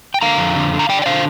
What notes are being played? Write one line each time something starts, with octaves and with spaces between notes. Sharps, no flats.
G5
D3 F5 A#5
F2
D3
D3
A#5
D3 D5 G5
G5
D3 C5 F5